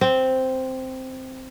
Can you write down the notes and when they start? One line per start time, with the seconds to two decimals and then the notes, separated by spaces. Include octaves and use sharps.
0.01 C4